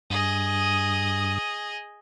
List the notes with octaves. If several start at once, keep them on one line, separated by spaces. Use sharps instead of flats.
G2 G#4 D#5 D#6